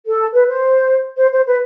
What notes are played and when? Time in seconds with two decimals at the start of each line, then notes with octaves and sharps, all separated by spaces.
0.06 A4
0.33 B4
0.48 C5
1.17 C5
1.32 C5
1.46 B4